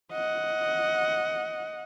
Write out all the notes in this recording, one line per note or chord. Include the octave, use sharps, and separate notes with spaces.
D#5 F#5